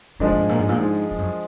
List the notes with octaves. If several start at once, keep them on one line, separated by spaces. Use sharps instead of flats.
G#2 F3 G#3 D4
A#2
G#2
A#2
G#2
A#2
G#2
G#2
F#2